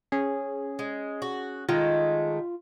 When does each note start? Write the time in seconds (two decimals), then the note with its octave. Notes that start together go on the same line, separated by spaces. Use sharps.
0.12 C#4 G#4
0.79 G#3
1.22 F#4
1.69 D#3 G#3 A3 F4